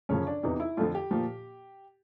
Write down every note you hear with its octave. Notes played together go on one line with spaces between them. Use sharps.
F#2 C#3 F3 C#4
D4
E2 C3 E3 D#4
E4
F2 D3 F3 F4
G4
A#2 F3